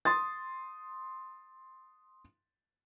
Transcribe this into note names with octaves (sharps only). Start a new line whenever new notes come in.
C6 D#6 A6